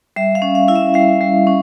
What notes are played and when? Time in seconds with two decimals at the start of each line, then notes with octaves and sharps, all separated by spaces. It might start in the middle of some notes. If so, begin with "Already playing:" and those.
0.16 G3 E5
0.35 F5
0.42 C#4
0.55 F5
0.68 E4 F5
0.76 E5
0.94 G3 F5
1.21 G3
1.47 C#4